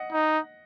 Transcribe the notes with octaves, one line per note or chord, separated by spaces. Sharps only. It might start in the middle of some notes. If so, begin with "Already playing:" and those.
Already playing: D#5 F#5
D#4